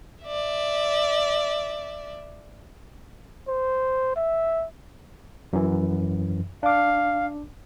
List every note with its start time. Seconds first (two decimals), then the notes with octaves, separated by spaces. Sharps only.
0.25 D5 E5
3.48 C5
4.16 E5
5.53 F#2 E3
6.63 D4 F5 D6